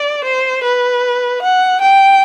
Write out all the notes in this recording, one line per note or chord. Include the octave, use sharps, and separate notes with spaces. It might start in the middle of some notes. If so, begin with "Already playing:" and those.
Already playing: D5
C5
B4
F#5
G5